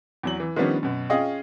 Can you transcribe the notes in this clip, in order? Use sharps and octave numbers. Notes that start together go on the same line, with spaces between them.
E2 F#3 F#7
E3
D#3 F3 G3 B3 C#4 D4
F#2 B2
C#4 F4 G#4 D#5 G5